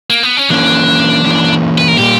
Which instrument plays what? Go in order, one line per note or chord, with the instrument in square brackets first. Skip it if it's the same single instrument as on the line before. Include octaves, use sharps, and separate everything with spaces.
[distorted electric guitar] A#3
B3
C#4
[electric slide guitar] E3 A#3 C#4 [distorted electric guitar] D4
[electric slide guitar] E3 A#3 C#4
[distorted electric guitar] B4
A#4
[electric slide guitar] A#2 G3 A#3 [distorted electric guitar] G4